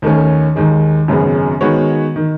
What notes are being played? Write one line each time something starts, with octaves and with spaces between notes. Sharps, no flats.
D#2 D#3 A3 C#4
D#2 D#3 G#3
G#1 F#2 C#3 G#3 B3
D#3 G#3 B3 F#4 C#5
D#3